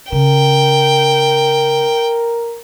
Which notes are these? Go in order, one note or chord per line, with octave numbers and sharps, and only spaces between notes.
C#3 A#4 G5